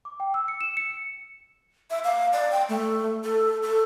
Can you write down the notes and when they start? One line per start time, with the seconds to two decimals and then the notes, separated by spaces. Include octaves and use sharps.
0.05 D6
0.20 G5
0.34 E6
0.48 C#7
0.61 E7
0.77 C#7
1.90 E5
2.04 F5
2.33 D5
2.52 G5
2.69 A3
3.24 A4
3.63 A4